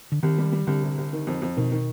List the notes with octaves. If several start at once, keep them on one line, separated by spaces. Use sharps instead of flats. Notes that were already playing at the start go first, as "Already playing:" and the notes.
D3
C2 D#3
G3
G3
C2 D3
C3
C2
D#3
F2
F2
B2 D#3
D#3